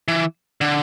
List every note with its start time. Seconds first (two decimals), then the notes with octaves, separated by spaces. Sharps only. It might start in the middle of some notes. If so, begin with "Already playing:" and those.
0.08 E3
0.61 D3